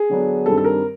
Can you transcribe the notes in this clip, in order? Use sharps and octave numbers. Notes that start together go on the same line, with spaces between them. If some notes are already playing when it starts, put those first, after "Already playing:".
Already playing: G#4
D3 F#3 B3 D4
G2 D#3 G3 C4 A4
A4
A#4